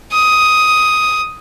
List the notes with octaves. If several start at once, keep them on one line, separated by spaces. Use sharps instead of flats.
D#6